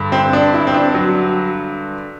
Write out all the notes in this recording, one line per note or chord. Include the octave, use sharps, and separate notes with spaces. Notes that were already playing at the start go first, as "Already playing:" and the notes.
Already playing: G2 D3
C4
D4
E4
C4
D4
F#3